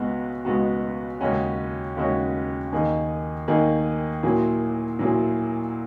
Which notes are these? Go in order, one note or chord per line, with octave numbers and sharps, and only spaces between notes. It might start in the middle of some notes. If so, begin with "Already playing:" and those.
Already playing: C#2 B2 G#3 B3 F#4
C#2 B2 G#3 B3 F#4
D#2 C#3 G#3 C#4 F#4
D#2 C#3 G#3 C#4 F#4
D#2 D#3 A#3 D#4 G#4
D#2 D#3 A#3 D#4 G#4
A#2 F#3 A#3 E4 G#4
A#2 F#3 A#3 E4 G#4